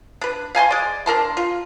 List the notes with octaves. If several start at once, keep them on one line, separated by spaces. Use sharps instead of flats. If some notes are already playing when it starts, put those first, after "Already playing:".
D4 B4
F5 G#5 A5 C6
G#3 D5
D4 A#4 A5 C6
F4